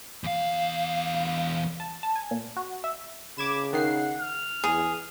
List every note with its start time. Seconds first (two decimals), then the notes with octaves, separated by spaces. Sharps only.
0.24 E2 F5
1.80 A5
2.03 A5
2.16 G#5
2.31 A#2
2.57 F#4
2.84 E5
3.38 C#3 B5 D6 G#6 E7
3.73 D#3 F#5 C7
4.21 F6
4.64 E2 G#4